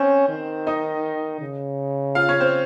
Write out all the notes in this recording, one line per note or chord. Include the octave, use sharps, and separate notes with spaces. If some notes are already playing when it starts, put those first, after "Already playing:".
Already playing: C4 C#4 C5
D#3
D#4 D#5
C#3
F4 F5
C#4 C#5
C4 C5